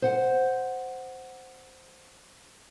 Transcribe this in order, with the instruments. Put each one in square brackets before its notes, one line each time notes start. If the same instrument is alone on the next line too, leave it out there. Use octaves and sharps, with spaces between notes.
[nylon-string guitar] C5 F#5